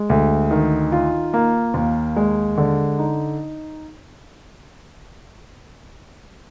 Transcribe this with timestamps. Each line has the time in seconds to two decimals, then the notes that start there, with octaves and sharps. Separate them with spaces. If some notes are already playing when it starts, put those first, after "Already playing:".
Already playing: G#3
0.10 D2
0.51 D#3
0.92 F4
1.34 A#3
1.74 D#2
2.16 G#3
2.58 D3
2.99 D#4